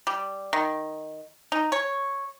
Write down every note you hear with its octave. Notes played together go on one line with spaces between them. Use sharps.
G3
D#3
D#4
C#5